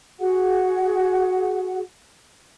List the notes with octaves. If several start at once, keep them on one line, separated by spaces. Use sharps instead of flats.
F#4 G#4 F#5